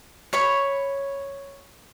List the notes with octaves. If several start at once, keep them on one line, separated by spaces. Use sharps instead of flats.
C#5 B5